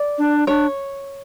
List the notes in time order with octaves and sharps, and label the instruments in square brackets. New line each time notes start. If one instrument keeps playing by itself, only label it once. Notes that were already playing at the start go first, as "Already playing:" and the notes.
Already playing: [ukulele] D5
[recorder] D4
[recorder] D4 [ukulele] C#5